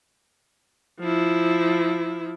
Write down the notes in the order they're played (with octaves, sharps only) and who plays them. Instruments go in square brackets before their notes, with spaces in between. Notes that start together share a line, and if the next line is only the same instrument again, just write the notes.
[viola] F3 E4